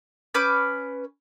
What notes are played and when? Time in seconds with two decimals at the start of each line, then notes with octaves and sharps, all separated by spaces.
0.34 C#4 B4 D6 G6